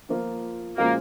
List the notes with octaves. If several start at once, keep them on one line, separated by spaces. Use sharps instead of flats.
F3 A#3 F4
A#2 F3 G#3 A#3 C#4 F#4